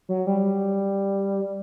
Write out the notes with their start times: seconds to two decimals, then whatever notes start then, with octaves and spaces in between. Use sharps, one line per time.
0.09 F#3
0.27 G3